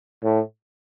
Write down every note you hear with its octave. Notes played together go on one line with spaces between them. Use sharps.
A2